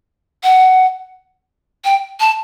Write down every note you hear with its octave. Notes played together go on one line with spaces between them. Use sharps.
F#5
G5
A5